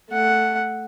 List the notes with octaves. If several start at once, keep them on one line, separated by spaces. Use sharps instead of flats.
A3 F#5